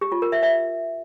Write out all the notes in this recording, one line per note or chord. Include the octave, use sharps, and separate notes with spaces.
G4
F4
A#4
E5
E5